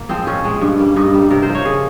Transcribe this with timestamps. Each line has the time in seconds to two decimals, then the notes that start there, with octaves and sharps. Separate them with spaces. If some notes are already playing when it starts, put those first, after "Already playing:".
Already playing: A#3
0.09 F3 G#3 C4
0.27 A#2 C#4
0.44 F3 G#3
0.61 G2
0.79 G3 A#3
0.96 G2 D#4
1.14 G3 A#3
1.31 C3 A#4
1.43 C5
1.49 F3 A#3
1.55 C#5
1.65 C#3 G#4